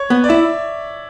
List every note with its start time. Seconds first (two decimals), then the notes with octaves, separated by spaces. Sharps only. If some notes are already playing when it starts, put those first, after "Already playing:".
Already playing: C#5
0.10 B3
0.24 D5
0.29 E4 E5